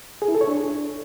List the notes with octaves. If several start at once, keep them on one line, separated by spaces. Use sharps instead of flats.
G#4
E4
A4
C#5
D4